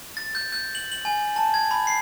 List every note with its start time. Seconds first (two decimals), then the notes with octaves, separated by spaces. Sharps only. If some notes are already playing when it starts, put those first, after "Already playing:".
0.17 A6
0.35 G6
0.52 G6
0.75 F#7
0.92 F#7
1.05 G#5
1.36 A5
1.54 G#6
1.71 B5
1.87 C7